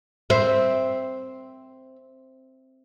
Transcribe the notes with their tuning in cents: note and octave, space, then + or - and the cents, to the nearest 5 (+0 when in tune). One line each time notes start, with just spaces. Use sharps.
C4 +0 E5 +0